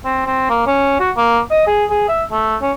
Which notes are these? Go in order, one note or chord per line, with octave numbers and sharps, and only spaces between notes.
C4
C4
A#3
C#4
F#4
A#3
D#5
G#4
G#4
E5
A3
C#4